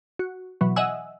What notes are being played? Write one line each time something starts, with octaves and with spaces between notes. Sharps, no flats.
F#4
B2 E3 F#3
D#5 E5 F#5 G#5 E6